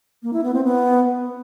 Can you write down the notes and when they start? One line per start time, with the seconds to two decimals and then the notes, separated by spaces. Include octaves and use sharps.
0.23 A#3
0.33 E4
0.43 B3
0.54 C4
0.64 B3